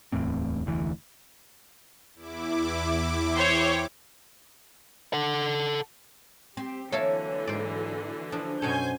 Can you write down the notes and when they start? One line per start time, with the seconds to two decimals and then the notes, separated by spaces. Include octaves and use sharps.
0.12 D1 E2 A2 C4
0.66 F1 D2 E3
2.14 E2 E4 D6
3.37 C5 C#5 G5
5.13 A4 F#5
6.57 C4 G4
6.92 D3 E3 F#3 A#3 A4 A#4 C#5 E5
7.47 G#2 C5 D5
8.32 F3 D4
8.62 F#2 B2 C#4 A4 C5 G#5 G6